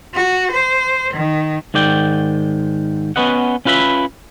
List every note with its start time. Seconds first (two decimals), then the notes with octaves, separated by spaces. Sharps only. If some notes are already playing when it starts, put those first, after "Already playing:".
0.14 F#4
0.52 C5
1.14 D#3
1.74 G#2 D#3 D5 G5
3.16 B3 C#4 B4 D#5 F#5
3.65 C#4 F4 B4 E5 B5